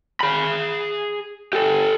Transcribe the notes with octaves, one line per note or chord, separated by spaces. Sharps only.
G#4 B5
G4 A4